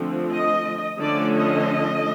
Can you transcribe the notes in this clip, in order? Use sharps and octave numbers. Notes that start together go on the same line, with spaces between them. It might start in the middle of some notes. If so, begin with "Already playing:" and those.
Already playing: D3 F3 A3 C4
D#5
D3 F3 A3 C#4 D5
D#5